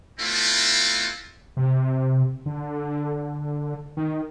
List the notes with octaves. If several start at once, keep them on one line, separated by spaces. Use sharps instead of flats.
A3 B3 C4 E4 F4 A4
C3
D3
D#3